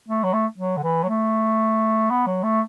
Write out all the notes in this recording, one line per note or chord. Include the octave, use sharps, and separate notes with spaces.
A3
F#3
A3
F#3
D3
E3
F#3
A3
B3
F#3
A3